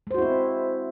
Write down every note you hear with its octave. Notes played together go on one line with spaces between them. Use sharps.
G#3 C4 E4 F#4 C5